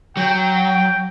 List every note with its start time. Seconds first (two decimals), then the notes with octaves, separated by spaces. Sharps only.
0.17 F#3 G5